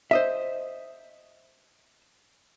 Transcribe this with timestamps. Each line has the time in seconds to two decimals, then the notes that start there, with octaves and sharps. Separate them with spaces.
0.11 C5 D#5 E5